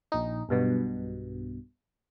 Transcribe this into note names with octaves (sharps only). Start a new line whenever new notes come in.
A#1 D#4
B1 G2 B2